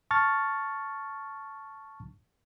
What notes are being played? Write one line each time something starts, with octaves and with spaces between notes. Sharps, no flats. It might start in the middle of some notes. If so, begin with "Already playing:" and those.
A5 C#6 F6 A6